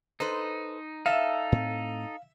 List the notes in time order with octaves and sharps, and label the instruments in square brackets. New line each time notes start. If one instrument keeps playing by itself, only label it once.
[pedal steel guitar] D#4 [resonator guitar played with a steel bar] A4 B4 C5
[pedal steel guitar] D#4 A4 [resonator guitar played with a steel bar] E5 [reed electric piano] F5
[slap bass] A2 C4